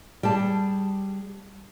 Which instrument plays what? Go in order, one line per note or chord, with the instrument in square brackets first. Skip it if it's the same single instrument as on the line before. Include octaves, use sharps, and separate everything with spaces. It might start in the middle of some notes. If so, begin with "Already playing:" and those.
[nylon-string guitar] G3 G#4 A5